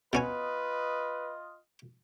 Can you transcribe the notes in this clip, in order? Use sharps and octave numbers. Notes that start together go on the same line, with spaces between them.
B2 C#4 F4 B4 D#5 G#5